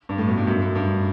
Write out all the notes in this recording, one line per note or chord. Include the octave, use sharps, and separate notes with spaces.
G2
A2
B2
G2
F#2
F#2
G2